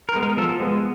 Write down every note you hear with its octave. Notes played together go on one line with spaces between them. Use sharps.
A#4
G#3 B3
A#4
F3 A4
G#3 B3